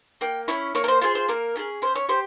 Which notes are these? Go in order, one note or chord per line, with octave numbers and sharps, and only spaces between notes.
A#3 G5
C#4 E4 C#5
A#3 C#5
A#4
C5
F4 G#4 C5
C5
A#3 A#4
C#4 F4 G#4
C#4 C5
C#5
G4 C5